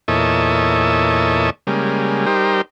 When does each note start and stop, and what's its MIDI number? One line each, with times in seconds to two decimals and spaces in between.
0.08 1.50 40
0.08 1.50 46
0.08 1.50 69
0.08 1.50 73
0.08 1.50 75
0.08 1.50 76
1.67 2.26 49
1.67 2.26 55
1.67 2.26 56
1.67 2.26 58
2.26 2.61 55
2.26 2.61 63
2.26 2.61 67
2.26 2.61 70
2.26 2.61 72